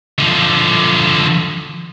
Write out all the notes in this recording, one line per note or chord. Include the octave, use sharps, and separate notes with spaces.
D3 F3